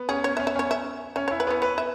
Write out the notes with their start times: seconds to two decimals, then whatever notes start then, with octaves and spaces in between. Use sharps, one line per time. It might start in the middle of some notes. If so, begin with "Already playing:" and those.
Already playing: B3
0.09 C#4 G#4
0.24 C#4 C#5
0.37 E5
0.40 C#4
0.47 E5
0.55 C#4 C#5
0.71 E5
1.16 C#4 E5
1.28 C#5
1.31 E4
1.40 B4
1.47 B3 C#5
1.62 B4 C#5
1.78 E5